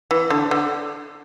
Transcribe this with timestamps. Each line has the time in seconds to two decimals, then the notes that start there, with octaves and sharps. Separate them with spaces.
0.11 E3
0.30 D3
0.51 D3